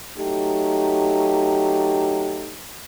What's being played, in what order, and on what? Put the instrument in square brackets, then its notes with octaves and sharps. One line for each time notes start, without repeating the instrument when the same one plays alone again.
[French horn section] F#3 A3 D#4 G4